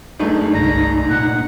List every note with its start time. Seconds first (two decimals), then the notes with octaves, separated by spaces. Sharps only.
0.19 C#2 F#2 A3 D4 D#4
0.55 G1 C2 A#5
1.10 A#2 F#5